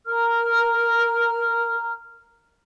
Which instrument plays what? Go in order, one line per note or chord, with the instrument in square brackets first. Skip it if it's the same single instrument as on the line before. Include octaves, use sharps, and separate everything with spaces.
[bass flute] A#4 [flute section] A#5 F6